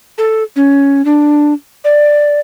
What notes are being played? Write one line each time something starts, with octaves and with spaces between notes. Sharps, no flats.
A4
C#4
D4
D5